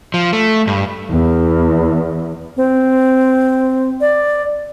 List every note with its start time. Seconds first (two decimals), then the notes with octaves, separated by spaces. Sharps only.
0.14 F3
0.33 A3
0.67 G2
1.10 E2
2.57 C4
4.01 D5